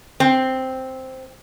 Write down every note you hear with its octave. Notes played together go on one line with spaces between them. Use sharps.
C4